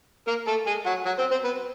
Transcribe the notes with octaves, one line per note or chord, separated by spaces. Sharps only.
A#3 A#4
A3 A4
G#3 G#4
F#3 F#4
F#3 F#4
C4 C5
C4 C5
B3 B4